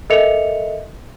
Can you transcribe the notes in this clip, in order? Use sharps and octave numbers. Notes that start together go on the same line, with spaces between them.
A4 A#4 D#5 E5 C#7 F7